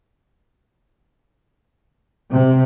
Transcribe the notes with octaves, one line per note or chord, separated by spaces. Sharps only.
C3